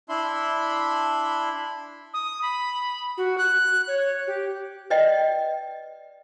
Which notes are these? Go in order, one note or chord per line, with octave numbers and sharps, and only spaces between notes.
D4 E4 E5 B5 C6
D#6
B5
F#4
F#6
C#5
G4
B4 D5 D#5 G5